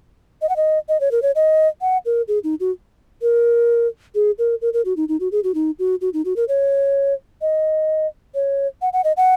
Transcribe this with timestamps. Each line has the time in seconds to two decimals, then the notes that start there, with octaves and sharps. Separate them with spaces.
0.42 D#5
0.49 F#5
0.56 D#5
0.89 D#5
1.00 C#5
1.11 A#4
1.22 C#5
1.35 D#5
1.81 F#5
2.05 A#4
2.28 G#4
2.44 D#4
2.60 F#4
3.22 A#4
4.15 G#4
4.39 A#4
4.62 A#4
4.73 A#4
4.85 F#4
4.97 D#4
5.09 D#4
5.20 F#4
5.32 G#4
5.44 F#4
5.55 D#4
5.79 F#4
6.01 F#4
6.14 D#4
6.25 F#4
6.36 A#4
6.48 C#5
7.42 D#5
8.35 C#5
8.82 F#5
8.93 F#5
9.04 D#5
9.17 F#5